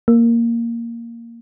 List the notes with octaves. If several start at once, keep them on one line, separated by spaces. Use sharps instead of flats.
A#3